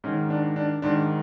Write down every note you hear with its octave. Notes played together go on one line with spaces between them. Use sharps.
G#2 D#3 C#4
D4
D4
G#2 D#3 D4